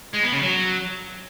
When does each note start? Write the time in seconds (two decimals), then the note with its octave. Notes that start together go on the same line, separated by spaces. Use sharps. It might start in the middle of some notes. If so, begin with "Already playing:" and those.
0.13 G#3
0.23 B3
0.32 C#3
0.42 F#3